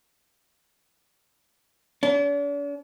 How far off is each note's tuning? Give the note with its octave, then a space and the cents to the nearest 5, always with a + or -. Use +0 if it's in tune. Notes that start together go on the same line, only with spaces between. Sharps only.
D4 -45